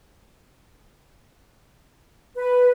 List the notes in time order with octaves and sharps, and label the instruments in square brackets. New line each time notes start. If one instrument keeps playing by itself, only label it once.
[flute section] B4